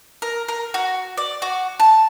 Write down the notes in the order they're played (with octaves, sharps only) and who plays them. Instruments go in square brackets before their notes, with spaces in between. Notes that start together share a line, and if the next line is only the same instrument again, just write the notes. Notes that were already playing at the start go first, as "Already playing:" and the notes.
[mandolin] A#4
A#4
F#4
D5
F#4
A5